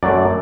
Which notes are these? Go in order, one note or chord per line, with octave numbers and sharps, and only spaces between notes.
F#2 F#3 A3 D5